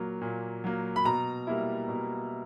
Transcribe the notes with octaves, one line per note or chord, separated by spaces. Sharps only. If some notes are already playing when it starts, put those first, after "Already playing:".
Already playing: A#2 F#3 A#3
A#2
F#3 A#3
B5
B2 A#5
G3 A#3 E4
B2